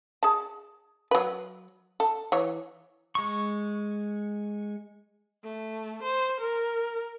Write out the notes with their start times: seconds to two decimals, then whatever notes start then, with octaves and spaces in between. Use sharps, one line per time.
0.23 G#4 A5
1.11 F#3 B4
2.00 A4
2.32 E3 C#5
3.15 G#3 C#6
5.44 A3
6.03 C5
6.41 A#4